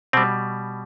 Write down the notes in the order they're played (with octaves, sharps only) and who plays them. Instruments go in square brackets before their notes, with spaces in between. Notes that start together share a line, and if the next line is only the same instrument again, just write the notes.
[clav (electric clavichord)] B2 G3 C4